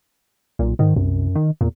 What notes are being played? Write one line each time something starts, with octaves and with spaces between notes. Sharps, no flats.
B1 A#2
G#2 D#3
C2 F#2
D#3
E2 A#2